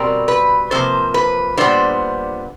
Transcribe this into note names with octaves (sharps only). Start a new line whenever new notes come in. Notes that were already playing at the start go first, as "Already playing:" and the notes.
Already playing: B2 G3 C4 A#4
B4
C3 F3 A#3 C5
B4
A#2 G3 B3 D4 F4 C5